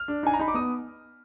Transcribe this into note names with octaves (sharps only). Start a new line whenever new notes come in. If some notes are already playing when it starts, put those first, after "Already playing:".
Already playing: F6
D4
D#4 G#5
A#5
D#4 B5
D6
B3 D#6